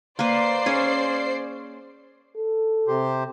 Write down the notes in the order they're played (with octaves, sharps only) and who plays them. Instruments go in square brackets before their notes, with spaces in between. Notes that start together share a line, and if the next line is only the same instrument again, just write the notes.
[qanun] A#3 B4 [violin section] C5 D5 C7
[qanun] C#4 G#4
[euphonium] A4
[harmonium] C3 G4 C5